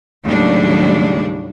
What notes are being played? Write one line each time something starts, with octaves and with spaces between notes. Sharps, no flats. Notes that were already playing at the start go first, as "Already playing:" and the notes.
D#2 A2 C#3 F#3 G3 D4